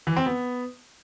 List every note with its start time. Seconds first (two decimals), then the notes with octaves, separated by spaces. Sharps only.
0.07 E3
0.16 C4
0.26 B3